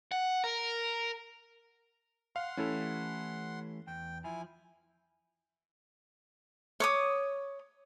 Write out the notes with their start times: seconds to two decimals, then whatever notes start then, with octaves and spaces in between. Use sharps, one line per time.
0.12 F#5
0.44 A#4
2.36 F5 F#5 C6
2.57 E3 A3 C#4 E4 G4 A4
3.87 E2 G5
4.24 F3 E4 G#5
6.80 C#5 D6 D#6